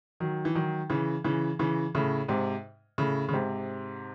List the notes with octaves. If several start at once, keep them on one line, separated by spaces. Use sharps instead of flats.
D#3 F#3
E3
D#3 F#3
C#3 E3
C#3 E3
C#3 E3
A2 C#3
G#2 C3
A2 C#3
C#3
G#2 C3